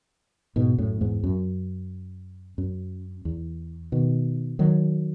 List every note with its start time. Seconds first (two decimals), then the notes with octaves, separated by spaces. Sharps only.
0.56 G#2 B2
0.78 F#2 A2
1.01 E2 G#2
1.24 F#2
2.58 F#2
3.25 E2
3.92 B2 D#3
4.59 D#3 F#3